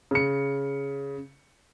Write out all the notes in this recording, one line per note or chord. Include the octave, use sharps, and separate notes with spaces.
C#3 C#7